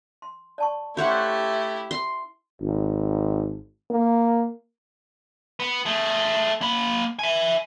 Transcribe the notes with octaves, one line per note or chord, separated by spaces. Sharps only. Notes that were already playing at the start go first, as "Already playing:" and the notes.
C6
D5 A5 C#6
A3 C#4 E4 G4 C5 C#5 F#5
C6
G#1
A#3
B3
A3 G#4
A#3 B5
E5 G#5